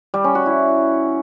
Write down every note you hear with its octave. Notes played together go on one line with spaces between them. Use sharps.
G3
C#4
F#4
E4